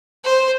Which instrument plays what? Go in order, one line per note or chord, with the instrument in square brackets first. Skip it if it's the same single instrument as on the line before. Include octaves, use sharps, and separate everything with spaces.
[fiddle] C5